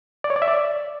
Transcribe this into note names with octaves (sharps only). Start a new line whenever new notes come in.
D5
C#5
D5
E5
D5